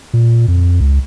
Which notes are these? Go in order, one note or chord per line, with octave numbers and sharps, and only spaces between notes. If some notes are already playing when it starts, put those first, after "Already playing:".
A#2
F2
C#2